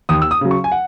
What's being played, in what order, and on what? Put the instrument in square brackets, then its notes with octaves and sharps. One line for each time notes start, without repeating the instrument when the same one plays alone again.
[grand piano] D#2 D#6
E6
D#6
C#3 F#3
C#6
G#5
F#5